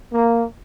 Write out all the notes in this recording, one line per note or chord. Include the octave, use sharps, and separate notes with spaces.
A#3